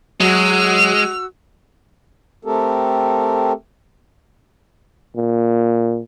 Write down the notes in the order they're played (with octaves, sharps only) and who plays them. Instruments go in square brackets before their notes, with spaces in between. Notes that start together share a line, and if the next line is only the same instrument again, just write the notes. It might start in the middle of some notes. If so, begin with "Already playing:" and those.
[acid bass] F#3 [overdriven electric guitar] G#3 [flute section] F#4 E6 [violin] F7
[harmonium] A3 C4 G4 A4 A#4
[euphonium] A#2